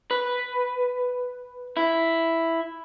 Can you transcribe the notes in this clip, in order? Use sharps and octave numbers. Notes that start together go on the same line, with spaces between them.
B4
E4